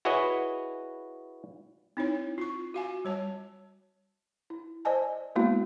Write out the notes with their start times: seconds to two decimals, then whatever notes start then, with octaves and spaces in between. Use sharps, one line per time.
0.05 E4 F#4 G#4 B4 C#5 D#5
1.97 C4 D#4 E4 C#5
2.38 F4 C#6
2.74 F#4 F5 G#5
3.05 G3 C#5 A5
4.50 E4
4.85 C5 D5 D#5 G#5 A5
5.35 G#3 A#3 B3 E4 F#4